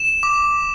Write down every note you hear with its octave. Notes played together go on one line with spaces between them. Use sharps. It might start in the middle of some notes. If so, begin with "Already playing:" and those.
Already playing: E7
D6